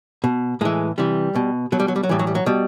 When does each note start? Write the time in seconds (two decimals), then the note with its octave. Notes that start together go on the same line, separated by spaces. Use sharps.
0.24 B2
0.61 A2 E3 G#3
0.98 C3 E3 G3
1.35 B2
1.72 B2 F#3
1.80 G3
1.88 F#3
1.96 G3
2.03 F#3
2.09 A2 E3 G3
2.19 F#3
2.27 G3
2.35 F#3
2.46 B2 G3